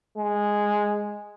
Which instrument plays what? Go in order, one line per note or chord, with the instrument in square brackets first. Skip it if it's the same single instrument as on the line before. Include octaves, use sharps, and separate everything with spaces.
[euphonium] G#3